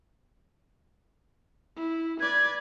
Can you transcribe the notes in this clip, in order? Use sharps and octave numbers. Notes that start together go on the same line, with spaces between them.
E4
B4 D5 G#6